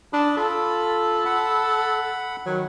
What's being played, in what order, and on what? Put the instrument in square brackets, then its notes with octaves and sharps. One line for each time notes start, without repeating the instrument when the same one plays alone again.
[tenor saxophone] D4 [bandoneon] A5 B5 D#6
[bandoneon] F4 B5 [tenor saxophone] A4
[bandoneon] F#5 B5
[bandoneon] D#3 [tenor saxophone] F#3